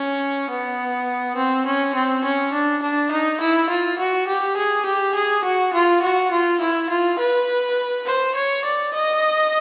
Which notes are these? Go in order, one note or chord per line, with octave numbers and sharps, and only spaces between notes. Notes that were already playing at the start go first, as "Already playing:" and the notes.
Already playing: C#4
B3
C4
C#4
C4
C#4
D4
D4
D#4
E4
F4
F#4
G4
G#4
G4
G#4
F#4
F4
F#4
F4
E4
F4
B4
C5
C#5
D5
D#5